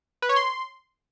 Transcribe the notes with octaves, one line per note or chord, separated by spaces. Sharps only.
B4
C#5
C6